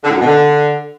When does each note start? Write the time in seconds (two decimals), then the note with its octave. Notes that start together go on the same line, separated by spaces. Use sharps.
0.04 D3
0.10 A2
0.15 F#2
0.21 B2
0.26 D3